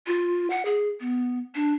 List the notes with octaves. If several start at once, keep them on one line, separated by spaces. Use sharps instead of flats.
F4
F#5
G#4
B3
D4